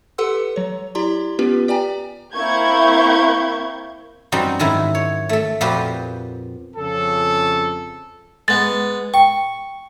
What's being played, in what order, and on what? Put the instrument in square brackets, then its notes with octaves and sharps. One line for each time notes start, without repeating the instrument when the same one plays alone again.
[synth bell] G4 A4 B4 F#5 C6 E6
F#3 C#5
E4 G4 D5 A#5 C6
B3 C#4 F4 G4 B4
G4 D5 G5 G#5 A#5
[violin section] A#3 C4 E4 C#6 G6 G#6
[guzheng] F#2 G3 C4 D#4 F#4
G#2 D#3 F#3 E4 B5
C#5
A3 A4
F2 A#2 F3 F#4 G4 B4
[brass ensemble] F2 C#3 A4
[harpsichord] G#3 B3 [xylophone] A6
[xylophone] G5 [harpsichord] C#6